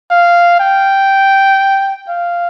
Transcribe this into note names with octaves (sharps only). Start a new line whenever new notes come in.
F5
G5
F5